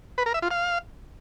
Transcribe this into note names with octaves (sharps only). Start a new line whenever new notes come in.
B4
A#4
E5
F4
F5